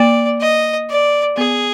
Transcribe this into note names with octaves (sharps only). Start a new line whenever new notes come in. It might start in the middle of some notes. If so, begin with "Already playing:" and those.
Already playing: A#3 D5
D#5
D5
B3 G#4